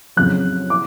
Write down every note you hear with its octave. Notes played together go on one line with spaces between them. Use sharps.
F2 C#3 F#3 F#6
D6